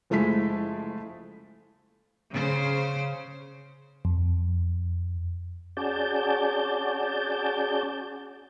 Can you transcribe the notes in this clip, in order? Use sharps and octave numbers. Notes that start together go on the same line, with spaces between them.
F#1 F3 G#3 A3 E4 B6
C#3 C5
F2
C#4 F#4 G#4 D5 A5 G6